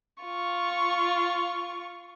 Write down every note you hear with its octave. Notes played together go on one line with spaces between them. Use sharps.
F4 C#6